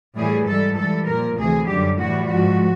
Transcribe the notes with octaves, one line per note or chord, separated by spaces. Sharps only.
A2 E3 G3 G#4
G#2 E3 G3 A4
G#2 E3 G3 A4
A#2 F3 A#4
D2 C3 E3 G#4
F#2 D3 G3 G4
A2 E3 G3 F#4
G#2 F3 F#4